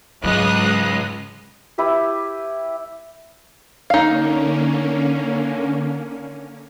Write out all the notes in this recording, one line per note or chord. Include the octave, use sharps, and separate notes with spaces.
C#2 G#2 F#3 G#3 D#6 F#6
E4 G4 B4 E5
D3 A#3 C#4 D#4 F5